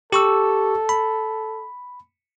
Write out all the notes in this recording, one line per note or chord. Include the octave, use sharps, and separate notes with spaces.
G4 A4 C#6 E6
B5